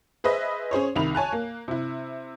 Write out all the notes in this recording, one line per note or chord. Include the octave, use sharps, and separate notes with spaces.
G#4 B4 C5 D#5 E5
C#4 G#4 C5 C#5
C2 D#3 B5 F7
C#5 G#5 A5 F#6
A#3
C3 E4